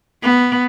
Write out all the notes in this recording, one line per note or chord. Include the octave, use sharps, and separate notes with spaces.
B3